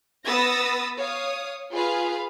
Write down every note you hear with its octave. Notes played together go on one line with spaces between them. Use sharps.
B3 B4 D#6 E6 A6 A#6
C#5 F5 D#6
F4 G#4 B4 F5